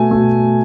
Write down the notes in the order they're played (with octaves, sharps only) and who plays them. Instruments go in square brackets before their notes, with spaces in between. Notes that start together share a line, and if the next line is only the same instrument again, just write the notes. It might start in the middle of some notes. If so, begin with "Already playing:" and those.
Already playing: [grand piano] B2 A3 G#5
B2 A3